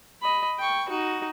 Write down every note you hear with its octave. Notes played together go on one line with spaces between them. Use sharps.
D#5 B5
G5 C#6
D#4 F#4